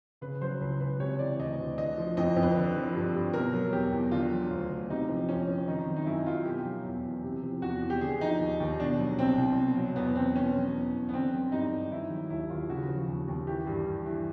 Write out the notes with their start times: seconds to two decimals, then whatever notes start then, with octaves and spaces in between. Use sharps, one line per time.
0.21 C#3 B4
0.41 F#3 C5
0.61 C#2 B4
0.80 C#2 B4
1.00 C3 C#5
1.19 E3 D5
1.39 D2 D#5
1.59 D2
1.78 D3 D#5
1.97 F3
2.17 F2 D#5
2.36 F2
2.43 B4
2.56 D3
2.76 F3
2.95 G2
3.14 G2
3.33 B2 A#4
3.53 F#3
3.73 E2 G4
3.92 E2
4.11 D3 F4
4.31 F#3
4.51 D2
4.71 D2
4.90 C3 D#4
5.09 F3
5.29 F2 C#4
5.48 F2
5.67 D#3 D#4
5.87 F#3
5.96 D#4
6.06 F#2 E4
6.26 F#2 F4
6.45 B2 G4
6.65 F#3
6.84 E2
7.05 E2
7.24 C3
7.43 F3
7.62 E2 F#4
7.81 E2
7.90 G4
8.01 D3 G#4
8.21 F3 D#4
8.40 D#2
8.60 D#2
8.79 B2 D4
8.99 F#3
9.18 C2 C4
9.38 C2
9.58 B2
9.77 F#3
9.96 E2 B3
10.16 E2 C4
10.35 B2 C#4
10.55 F#3
10.74 E2
10.93 E2
11.09 B3
11.14 D3 C4
11.33 F#3
11.52 G2 D#4
11.72 G2
11.91 D#3 E4
12.11 F#3
12.30 D#2 E4
12.50 D#2 F4
12.69 C#3 F#4
12.89 F3
13.08 D#2
13.28 D#2
13.47 E3 G4
13.67 G2
13.86 G2
14.06 E3